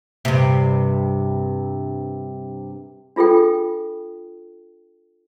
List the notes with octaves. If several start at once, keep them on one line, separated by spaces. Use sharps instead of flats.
G2 C3
D4 F4 G#4 A4 G5